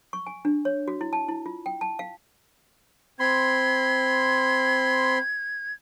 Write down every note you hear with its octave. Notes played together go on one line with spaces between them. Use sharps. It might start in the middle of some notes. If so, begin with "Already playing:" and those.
C#6
G#5
D4
C#5
F#4
E4
A5
E4
F4
G5
A5
F5
C4 B5 C6 G#6